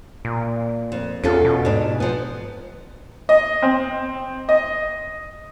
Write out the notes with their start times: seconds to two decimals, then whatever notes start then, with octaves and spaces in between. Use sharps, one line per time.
0.25 A#2
0.92 F2
1.24 E2 C#4 F4 A4
1.45 B2
1.65 G#2 D4
2.00 F3 B3
3.29 D#5
3.63 C4
4.49 D#5